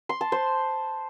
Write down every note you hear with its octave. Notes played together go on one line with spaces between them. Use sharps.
C6
A5
C5